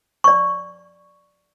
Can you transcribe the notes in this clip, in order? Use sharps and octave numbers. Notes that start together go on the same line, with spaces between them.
D5 C#6